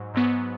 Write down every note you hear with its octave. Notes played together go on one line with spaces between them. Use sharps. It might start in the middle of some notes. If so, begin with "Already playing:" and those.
Already playing: G#2 F#3
G#2 F#3 B3